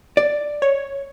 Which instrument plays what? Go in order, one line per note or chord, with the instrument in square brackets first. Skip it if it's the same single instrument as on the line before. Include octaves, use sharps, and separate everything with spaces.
[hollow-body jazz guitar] D5
[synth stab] C#5